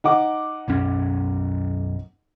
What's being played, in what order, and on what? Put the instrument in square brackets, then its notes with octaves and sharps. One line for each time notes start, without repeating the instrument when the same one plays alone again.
[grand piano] D#4 F#5 D6
[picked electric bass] B1 F#2 C#4